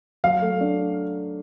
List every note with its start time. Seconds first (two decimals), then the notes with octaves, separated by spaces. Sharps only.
0.24 F#3 F5
0.42 A3
0.61 D4